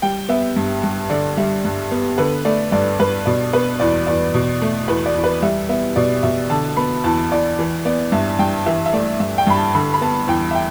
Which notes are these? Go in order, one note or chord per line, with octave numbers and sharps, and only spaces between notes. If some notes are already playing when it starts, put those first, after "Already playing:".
G3 G5
B3 E5
G2
G2
D3 D5
G3 E5
G2
B3
D3 B4
A3 D5
G2 D5
G2 B4
B2 D5
B3 B4
E2 D5
E2 D5
B2
A3
E2 B4
D5
E2
B4
G3 E5
B3 E5
B2 D5
B2 E5
D3 A5
B3 B5
E2 A5
E2 D5
E3
B3 D5
G2 E5
G2 G5
E3 E5
E5
A3 D5
G2 E5
G5
G2 B5
A5
D3 B5
B5
B3 A5
E2 G5
E5
G5